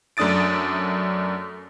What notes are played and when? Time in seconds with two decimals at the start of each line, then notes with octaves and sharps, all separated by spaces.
0.17 F#2 A3 D4 D#6 A6 D7